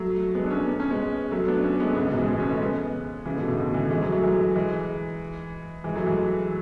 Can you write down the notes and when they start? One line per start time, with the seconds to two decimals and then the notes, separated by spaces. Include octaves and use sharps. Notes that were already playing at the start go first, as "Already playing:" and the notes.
Already playing: F#3 A3
0.35 G#3 B3
0.44 D4
0.50 A3 C#4
0.67 B3
0.80 C#4
0.91 G#3 B3
1.31 F#3 A3
1.48 B3 D4
1.64 A3 C#4
1.80 G#3 B3
1.96 A2 C#3
2.07 G#2 B2
2.18 E3 G#3
2.28 G#3 B3
2.40 A3 C#4
2.50 G#3 B3
2.61 G#3 B3
3.25 C#3 E3
3.37 B2 D3
3.47 A2 C#3
3.58 B2 D3
3.74 C#3 E3
3.90 E3 G#3
4.01 F#3 A3
4.12 F#3 A3
4.23 E3 G#3
4.55 E3 G#3
5.84 E3 G#3
5.96 F#3 A3
6.06 E3 G#3